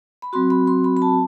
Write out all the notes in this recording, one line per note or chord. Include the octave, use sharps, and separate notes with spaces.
B5
F#3 C4 F#4 C6
B5
C6
B5
B5
A5